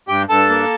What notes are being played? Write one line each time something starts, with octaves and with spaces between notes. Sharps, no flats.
G2 G4 G5
G2 A4 A5
A#3